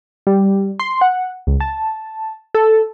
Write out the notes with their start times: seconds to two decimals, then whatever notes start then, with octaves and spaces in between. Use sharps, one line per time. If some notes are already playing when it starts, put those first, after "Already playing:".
0.27 G3
0.80 C6
1.01 F#5
1.47 C#2
1.60 A5
2.55 A4